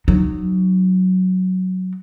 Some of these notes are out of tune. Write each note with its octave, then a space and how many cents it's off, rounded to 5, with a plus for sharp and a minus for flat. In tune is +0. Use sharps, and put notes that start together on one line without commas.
F#3 +0 D#4 -30